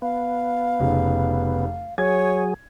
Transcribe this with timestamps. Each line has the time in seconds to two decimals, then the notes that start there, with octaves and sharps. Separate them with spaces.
0.02 B3 F5
0.80 F1 C#3 D#4
1.98 F#3 G#4 C#5 G#6